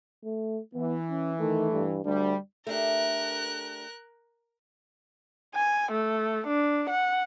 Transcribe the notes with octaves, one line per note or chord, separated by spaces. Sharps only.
A3
E3 B3
C#4
D#3 A3
G2
D2 G3 D4
A3 D4 G4 A#4 F#6
G#5
A3
D4
F#5